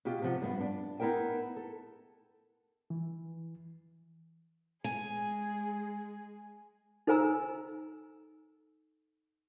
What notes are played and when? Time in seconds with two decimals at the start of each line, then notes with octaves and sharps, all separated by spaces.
0.05 B2 F4 G4
0.22 C3 F3 F#5
0.42 G2 B3
0.60 D4
1.00 B3 D#4 E4 A#4 G5
1.56 A4
2.90 E3
4.84 G#3 G#4 G#5
7.07 D#4 A4 C5 G#5 A#5 E6